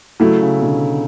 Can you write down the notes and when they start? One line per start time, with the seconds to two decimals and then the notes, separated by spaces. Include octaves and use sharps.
0.20 C#3 F#3 A3 E4
0.42 C#3
0.62 B2 D3